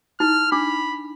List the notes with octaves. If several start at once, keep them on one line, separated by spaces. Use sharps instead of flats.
D#4 E4 F6
D4 B5 D6